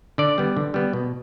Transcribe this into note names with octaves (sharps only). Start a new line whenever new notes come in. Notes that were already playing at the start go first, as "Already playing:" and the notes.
D3 D5
G3 B3
D3
G3 B3
B2